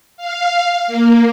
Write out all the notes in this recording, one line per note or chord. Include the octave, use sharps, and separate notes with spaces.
F5
A#3